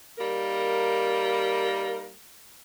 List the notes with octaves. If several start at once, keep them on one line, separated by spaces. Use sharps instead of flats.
G3 A#3 D#4 A#4